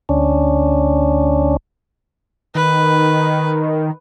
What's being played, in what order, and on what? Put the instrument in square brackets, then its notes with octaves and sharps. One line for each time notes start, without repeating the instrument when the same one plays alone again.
[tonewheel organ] D2 C#4 D4
[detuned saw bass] D#3 [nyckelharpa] B4